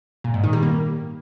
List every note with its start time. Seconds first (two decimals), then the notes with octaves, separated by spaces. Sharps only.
0.24 A#2
0.34 G#2
0.44 D#3
0.53 G3
0.63 A#3